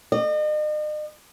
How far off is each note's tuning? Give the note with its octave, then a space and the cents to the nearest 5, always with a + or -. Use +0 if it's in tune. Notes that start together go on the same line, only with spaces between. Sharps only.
D#5 -40